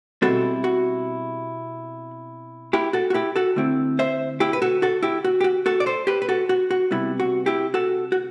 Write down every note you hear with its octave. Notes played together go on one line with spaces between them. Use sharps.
B2 G3 C4 E4 F#4 A4
F#4
E4 G4
F#4 A4
F#4
E4 G4
F#4 A4
D3 A3 C4 E4
C5 E5
E4 G4
B4
F#4 A4
F#4 A4
E4 G4
F#4
G4
F#4
F#4 A4
D5
A4 C5
G4 B4
B4
F#4 A4
F#4
F#4
C3 G3 B3 E4
F#4
E4 G4
F#4 A4
F#4